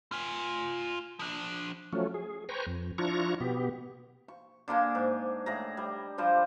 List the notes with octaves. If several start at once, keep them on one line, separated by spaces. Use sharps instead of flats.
F4 G#5
F3 D4
F3 F#3 A3 C#4
G#4
B4 C5 G5 G#5 A#5 C#6
F2
F3 D4 E4 F4 A#5 C#6
B2 B3 G4
C#6
D3 A#3 D4 G#5
G#2
A2 G#4 A#5
G3
F3 G3 D4 C5